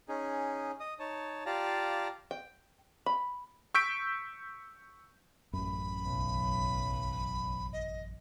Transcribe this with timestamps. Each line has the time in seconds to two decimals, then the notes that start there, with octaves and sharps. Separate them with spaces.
0.09 C#4 D#4 G#4
0.80 D#5 D#6
0.99 D#4 C#5 A5
1.46 F4 G4 D5 F5 A5 A#5
2.31 G5
3.06 B5
3.75 C#6 E6 G6 B6 D7
5.53 A1 F#2 B5
6.03 B1
7.73 D#5